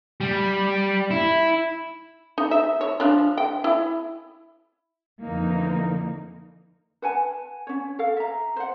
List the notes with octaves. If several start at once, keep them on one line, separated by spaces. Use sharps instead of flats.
G3
E4
D#4
E5
C#5
F3 D4
G5
E4
F2 D3 E3 A#3 D#4
B4 F#5 G#5 A5
C#4 C#5
A4 F5
E5 A#5
C5 F#5